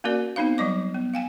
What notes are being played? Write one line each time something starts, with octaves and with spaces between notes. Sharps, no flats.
A#3 C#4 F#4 A#4 D5
B3 C4 D#4 C5 F5
F#3 G3 D#5 D6
B3
F5 G5 G#5